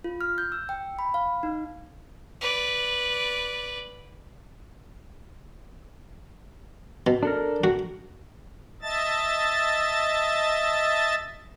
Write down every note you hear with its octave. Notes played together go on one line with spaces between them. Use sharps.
F4
F6
G6
E6
G5
B5
F5
D#4
B4 D5
B2
D4 A4 A#4
F#4
D#5 E5 A5 A6